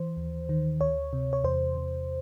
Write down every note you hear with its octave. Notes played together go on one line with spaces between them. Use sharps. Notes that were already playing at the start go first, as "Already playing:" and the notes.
Already playing: E3 C5
D#2
D#3
D2 C#5
C3
C#5
E2 C5
C3